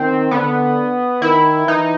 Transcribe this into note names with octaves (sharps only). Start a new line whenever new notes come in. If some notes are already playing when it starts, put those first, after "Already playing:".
Already playing: D#3 C4
D3 B3
D#3 E4
E3 D#4